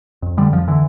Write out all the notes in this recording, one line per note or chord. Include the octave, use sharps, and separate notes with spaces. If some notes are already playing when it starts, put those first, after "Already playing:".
F2
D3 G3
F2 F3
D3 E3